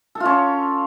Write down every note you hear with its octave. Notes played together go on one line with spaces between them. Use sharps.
A4
F4
C#4